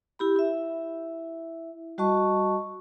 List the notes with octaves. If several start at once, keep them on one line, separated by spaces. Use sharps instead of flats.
E4 G4 B5
E4 E5
G3 F#4 D#5 A5 C#6